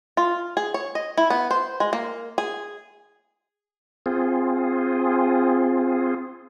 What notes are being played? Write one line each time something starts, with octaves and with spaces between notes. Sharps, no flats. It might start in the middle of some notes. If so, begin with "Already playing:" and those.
F4
G#4
C#5
D#5
E4
B3
C5
G#3
A#3
G#4
C4 F4 G#4